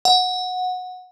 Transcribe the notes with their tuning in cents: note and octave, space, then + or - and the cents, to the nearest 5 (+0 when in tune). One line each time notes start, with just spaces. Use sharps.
F#5 -15